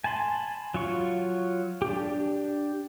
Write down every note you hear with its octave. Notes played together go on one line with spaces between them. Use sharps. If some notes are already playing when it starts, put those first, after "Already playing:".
G#5 A5 B5 C6
F#3 F4 C#6
D4 G4